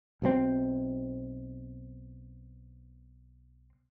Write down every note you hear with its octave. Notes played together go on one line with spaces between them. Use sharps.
B1 B2 G3 C4